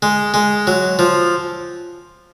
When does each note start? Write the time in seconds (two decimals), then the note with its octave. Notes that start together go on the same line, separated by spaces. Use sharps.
0.02 G#3
0.34 G#3
0.67 F#3
0.99 F3